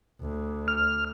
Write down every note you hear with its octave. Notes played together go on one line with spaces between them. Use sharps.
D2
F6